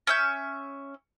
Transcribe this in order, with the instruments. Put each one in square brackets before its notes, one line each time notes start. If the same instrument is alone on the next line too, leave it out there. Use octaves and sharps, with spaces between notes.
[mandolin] C#4 E5 G6